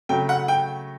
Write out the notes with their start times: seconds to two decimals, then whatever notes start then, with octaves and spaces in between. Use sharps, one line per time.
0.09 C#3 F#3 A3 G5
0.29 F#5
0.48 G5